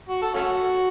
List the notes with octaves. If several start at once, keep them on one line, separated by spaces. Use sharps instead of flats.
F#4
A4
A3 C#4 F#4